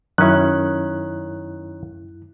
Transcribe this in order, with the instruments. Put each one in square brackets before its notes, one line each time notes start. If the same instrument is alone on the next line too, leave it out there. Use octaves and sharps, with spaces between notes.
[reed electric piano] F#2 E4 [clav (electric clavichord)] D#3 C#4 [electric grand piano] F#6